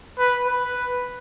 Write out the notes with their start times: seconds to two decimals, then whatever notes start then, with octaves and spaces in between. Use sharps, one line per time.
0.18 B4
0.47 B4